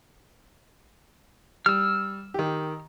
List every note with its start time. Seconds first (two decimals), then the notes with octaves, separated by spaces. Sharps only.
1.66 G3 E6 F6
2.34 D#3 G4